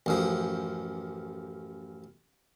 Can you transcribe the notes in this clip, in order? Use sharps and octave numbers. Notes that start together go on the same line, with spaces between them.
A1 F#2 F3